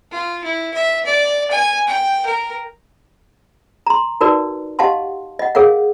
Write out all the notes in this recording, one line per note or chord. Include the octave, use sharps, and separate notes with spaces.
F4
E4
E5
D5
G#5
G5
A#4
A#5 C6
D#4 F#4 A#4 B4 D5
G4 D#5 F5 F#5 A5 C6
D#5 F#5
G#4 A#4 C#5 F5 F#5